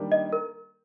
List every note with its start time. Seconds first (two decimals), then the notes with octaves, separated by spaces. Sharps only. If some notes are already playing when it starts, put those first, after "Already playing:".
Already playing: D#3 G3 A#3 D4 G4
0.12 D#5
0.33 A#4